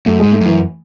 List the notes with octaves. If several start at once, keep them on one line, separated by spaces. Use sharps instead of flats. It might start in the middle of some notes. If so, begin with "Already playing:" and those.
F#2 A3
G#2 G#3
A3
F#2 E3